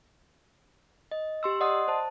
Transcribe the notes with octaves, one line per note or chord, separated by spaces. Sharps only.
D#5
G4 C6 E6
D5 D#5 F#5 C6 D#6
C5 A5